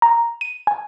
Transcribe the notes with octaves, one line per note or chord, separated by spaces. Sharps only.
A#5
D#7
G#5